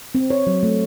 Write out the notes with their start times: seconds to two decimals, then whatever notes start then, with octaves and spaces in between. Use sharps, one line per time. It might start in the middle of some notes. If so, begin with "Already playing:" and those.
0.15 C4
0.30 C#5
0.47 F#3
0.63 A3